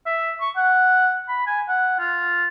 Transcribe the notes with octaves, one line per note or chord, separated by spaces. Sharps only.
E5
C#6
F#5
B5
G#5
F#5
F4